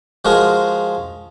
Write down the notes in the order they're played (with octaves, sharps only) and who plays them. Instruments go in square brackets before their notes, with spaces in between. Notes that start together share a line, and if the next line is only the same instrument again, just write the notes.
[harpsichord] F3 G#3 F#4 G#4 A#4